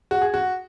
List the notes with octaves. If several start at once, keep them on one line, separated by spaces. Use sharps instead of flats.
F#4
G#4
F#4